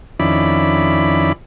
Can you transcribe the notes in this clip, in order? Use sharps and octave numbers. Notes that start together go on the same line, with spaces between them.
F2 D#3 C#4 E4 D5 B5